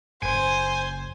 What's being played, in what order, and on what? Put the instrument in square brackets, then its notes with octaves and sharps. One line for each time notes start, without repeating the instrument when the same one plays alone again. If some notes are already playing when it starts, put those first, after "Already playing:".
[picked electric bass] F#1 [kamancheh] C5 [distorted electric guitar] G#5